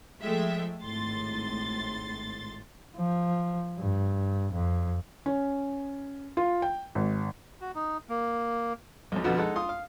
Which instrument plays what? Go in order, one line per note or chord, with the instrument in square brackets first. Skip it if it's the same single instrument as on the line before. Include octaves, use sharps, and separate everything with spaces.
[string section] F3 G#3 A3 E5 G5
G#1 A2 C6 A6
[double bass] F3
G2
F2
[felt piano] C#4
F4
G5
G#1
[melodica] F#4
D#4
A#3
[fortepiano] B1 F#2
F2 B2 D3 F3 B3
G#3 D#4 A4 F#5
F4 C6 D#6
F5